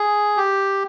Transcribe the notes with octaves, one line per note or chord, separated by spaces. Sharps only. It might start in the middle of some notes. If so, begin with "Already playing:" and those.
Already playing: G#4
G4